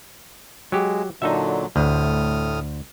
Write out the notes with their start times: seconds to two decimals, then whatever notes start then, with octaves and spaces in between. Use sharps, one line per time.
0.72 F#3 G#3 G4
1.22 A#2 D3 F#3 D#4 A4 E5
1.76 D2 A2 D#6 F6